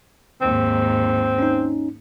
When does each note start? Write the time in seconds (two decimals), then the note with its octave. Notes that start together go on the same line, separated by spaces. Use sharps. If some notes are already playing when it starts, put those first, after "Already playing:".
0.41 D#2 G#2 C4
1.38 C#4 D#4